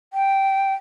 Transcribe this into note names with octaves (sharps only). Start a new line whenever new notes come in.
G5